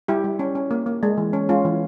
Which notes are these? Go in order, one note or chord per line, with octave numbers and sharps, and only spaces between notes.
G3 E4 G4
G3
C#4
C#4
A#3
A#3
G#3
E3
C#4
G#3 C#4 F4
E3